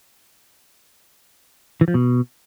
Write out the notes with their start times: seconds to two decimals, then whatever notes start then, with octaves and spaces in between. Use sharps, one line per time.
1.81 E3
1.88 F3
1.94 B2